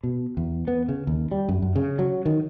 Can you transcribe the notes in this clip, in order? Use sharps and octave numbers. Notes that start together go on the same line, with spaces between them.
B2
E2
B3
C#3
D#2
G3
F#2
F#2
C#3
F#3
D#3